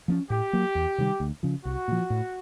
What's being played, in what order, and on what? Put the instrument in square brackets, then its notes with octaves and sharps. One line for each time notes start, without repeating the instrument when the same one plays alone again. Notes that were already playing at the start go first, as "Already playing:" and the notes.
[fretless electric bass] F3 A#3 C#4
[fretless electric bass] A2 [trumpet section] G4
[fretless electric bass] F#3 A#3
E2
C3 D#3 G3
D2
C#3 F3
[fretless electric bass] C2 [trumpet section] F#4
[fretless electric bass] A#2 F3
A2